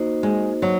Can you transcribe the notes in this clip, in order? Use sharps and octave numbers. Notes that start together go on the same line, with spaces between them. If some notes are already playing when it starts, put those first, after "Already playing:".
Already playing: A#3 D#4 F#4 C5 D#5
G#3
F#3